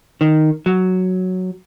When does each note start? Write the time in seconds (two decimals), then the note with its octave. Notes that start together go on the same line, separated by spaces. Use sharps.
0.21 D#3
0.66 F#3